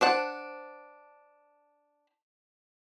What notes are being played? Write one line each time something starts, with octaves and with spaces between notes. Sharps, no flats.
D4 C5 F#5 A5